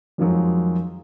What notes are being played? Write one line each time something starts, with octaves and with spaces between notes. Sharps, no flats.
F2 D#3 F3 F#3 G#3